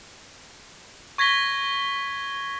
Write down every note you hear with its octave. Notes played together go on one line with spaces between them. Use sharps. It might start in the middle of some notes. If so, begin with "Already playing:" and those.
C#6 G#6 A#6 B6 G7